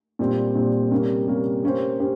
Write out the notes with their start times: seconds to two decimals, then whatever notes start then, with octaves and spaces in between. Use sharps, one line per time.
0.19 A#2 G3 C4
0.55 A#2 G3 C4
0.91 C3 G3 A#3 C#4
1.27 C3 G3 A#3 C#4
1.63 A#3 C#4 G4 C5
2.00 C#4 G4 C5